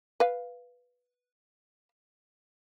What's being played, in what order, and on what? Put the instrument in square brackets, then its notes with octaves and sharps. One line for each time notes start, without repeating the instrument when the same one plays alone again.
[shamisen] B4 F5